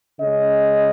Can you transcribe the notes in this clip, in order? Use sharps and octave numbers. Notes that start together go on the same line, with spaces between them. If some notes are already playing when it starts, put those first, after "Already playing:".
C#3 G#3 C#4 D#5